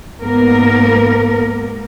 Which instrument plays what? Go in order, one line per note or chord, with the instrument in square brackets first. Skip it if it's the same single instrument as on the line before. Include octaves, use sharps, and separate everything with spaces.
[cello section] G#2 A#3 B3 A#4